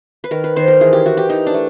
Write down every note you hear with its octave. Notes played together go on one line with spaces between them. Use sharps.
B4
D#3 A#4
B4
D#3 C5
A#4
E3 G#4
G4
E3 F#4
G4
E3 D#4
D4
A3